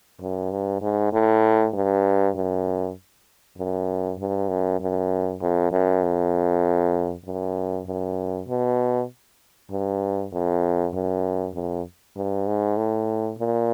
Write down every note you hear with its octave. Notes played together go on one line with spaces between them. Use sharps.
F#2
G2
G#2
A2
G2
F#2
F#2
G2
F#2
F#2
F2
F#2
F2
F#2
F#2
B2
G2
F2
F#2
F2
G2
G#2
A2
A#2